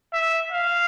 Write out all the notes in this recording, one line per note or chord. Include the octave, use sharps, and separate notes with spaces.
E5
F5